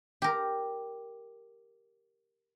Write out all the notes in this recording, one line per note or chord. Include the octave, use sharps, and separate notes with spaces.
G4 A#4